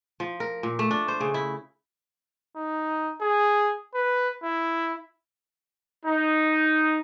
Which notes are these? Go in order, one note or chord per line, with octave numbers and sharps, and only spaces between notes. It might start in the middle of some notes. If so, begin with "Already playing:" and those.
F3
A#4
A#2
A3
D4
C5
C#3
E4
D#4
G#4
B4
E4
D#4